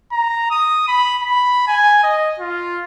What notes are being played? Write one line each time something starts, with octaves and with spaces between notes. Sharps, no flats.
A#5
D#6
B5
B5
G#5
D#5
F4